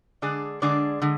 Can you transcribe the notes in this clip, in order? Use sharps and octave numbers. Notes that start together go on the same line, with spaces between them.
D3 G#3 D4 G#4 D5
D3 G#3 D4 G#4 D5
D3 G#3